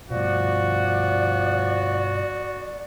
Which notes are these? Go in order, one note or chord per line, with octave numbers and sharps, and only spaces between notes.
G2 B2 F3 F#4 D5